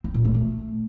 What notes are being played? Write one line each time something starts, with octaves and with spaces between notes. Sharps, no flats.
C4
A#2
A3
A3